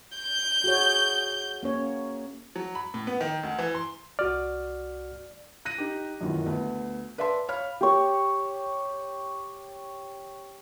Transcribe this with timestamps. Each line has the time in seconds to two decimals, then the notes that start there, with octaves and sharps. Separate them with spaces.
0.18 G6
0.64 F#4 G#4 C#5
1.63 A#3 C#4 C#5
2.56 F#3
2.75 B5
2.94 A2
3.07 B3
3.21 D#3
3.43 D2
3.59 E3
3.74 C6
4.19 C2 F#4 D5 F6
5.65 F#6 A#6 D#7
5.78 D#4 G4
6.21 F#2 A#2 D#3 E3 F#3
6.46 D2 B3
7.18 B4 D5 E5 A5 C6
7.48 C#5 F5 B5 F6
7.81 G4 C#5